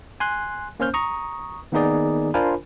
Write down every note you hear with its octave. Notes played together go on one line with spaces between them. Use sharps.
G#5 C6 F#6
A#3 C#4 C5 F6 G6
A#5 C#6 D#6
D#3 A#3 B3 D#4 G#4 D5
D4 F4 A#4 C5 G#5 B5